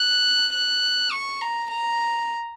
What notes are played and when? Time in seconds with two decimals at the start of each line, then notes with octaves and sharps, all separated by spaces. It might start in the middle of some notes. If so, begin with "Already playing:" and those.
Already playing: F#6
0.54 F#6
1.11 C#6
1.41 A#5
1.71 A#5